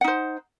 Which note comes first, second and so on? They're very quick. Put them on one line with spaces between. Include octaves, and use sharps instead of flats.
F#5 D#4 C5